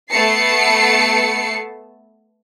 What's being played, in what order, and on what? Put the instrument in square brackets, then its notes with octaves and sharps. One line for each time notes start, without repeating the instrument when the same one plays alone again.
[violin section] A3 B3 A5 C7 C#7